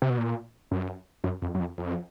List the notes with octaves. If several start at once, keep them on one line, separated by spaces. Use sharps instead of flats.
C3
B2
A#2
F#2
F#2
F2
F#2
F2
F2